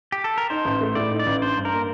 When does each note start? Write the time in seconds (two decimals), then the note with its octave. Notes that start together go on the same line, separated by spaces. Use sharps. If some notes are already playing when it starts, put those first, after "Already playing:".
0.12 G4
0.24 A4
0.38 A#4
0.50 D#4 C5
0.65 A1
0.81 A3
0.95 A2 D5
1.11 D#4
1.19 D5
1.27 A1
1.42 D4 C5
1.57 G2
1.65 A#4
1.72 A#3